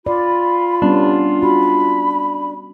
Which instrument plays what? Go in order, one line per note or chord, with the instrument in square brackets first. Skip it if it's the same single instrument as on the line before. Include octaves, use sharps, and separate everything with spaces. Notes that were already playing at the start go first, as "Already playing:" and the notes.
[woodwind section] F4 [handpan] D5 [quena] B5
[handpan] G3 B3 C#4 [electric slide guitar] D4
[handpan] F#4 [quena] B5